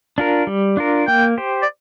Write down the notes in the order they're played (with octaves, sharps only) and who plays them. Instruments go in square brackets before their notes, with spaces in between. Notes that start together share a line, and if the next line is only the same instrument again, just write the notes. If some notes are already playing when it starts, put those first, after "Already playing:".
[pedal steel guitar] D4 F4 A#4
G3
D4 F4 A#4
[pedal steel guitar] A#3 [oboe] G5
[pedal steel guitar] G4 C5
[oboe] D5